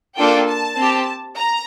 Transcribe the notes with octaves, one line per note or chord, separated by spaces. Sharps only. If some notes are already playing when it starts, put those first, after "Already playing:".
A#3 D4 F4 A4 G5
A5
C4 G4
A#5